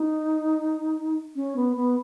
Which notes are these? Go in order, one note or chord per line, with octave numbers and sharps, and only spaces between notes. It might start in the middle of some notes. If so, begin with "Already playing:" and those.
Already playing: D#4
C#4
B3
B3